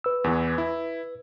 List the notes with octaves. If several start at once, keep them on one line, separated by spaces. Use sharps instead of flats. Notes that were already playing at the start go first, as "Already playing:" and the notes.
B4 E6
E2 E3
E4